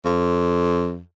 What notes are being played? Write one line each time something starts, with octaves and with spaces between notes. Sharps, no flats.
F2